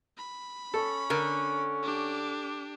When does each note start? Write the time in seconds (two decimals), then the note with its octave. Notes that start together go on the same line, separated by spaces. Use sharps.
0.18 B5
0.74 C#4 A4
1.10 D3 A#4
1.83 D4 G4